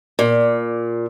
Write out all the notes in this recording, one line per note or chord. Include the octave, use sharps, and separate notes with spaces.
A#2